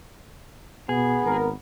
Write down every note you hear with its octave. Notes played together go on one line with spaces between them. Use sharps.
B2 B3 G#4
G#1 A#4